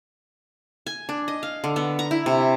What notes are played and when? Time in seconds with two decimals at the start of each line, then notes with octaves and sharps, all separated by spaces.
0.87 G#5
1.09 D4
1.28 D#5
1.43 F5
1.64 D3
1.76 B3
1.99 A#5
2.11 E4
2.26 C3